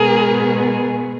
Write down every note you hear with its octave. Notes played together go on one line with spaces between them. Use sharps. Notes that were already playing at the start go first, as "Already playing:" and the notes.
Already playing: B2 G#3 B3 G#4 A#4